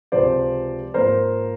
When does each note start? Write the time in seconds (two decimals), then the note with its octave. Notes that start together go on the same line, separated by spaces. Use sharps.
0.12 C#2 C3 F3 G#3 C5 D5
0.94 G#2 F3 A#3 A#4 C5